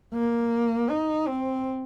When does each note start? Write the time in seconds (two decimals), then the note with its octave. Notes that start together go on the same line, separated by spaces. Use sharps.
0.14 A#3
0.90 D#4
1.27 C4